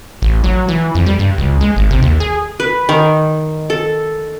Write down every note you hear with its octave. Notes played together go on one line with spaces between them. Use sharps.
A1
F#3
E3
F2
G3
G2
C#2
G#3
G#1
C3
D#2
G#4
B4
D#3
A4